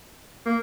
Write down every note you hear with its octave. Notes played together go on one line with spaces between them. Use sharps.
A#3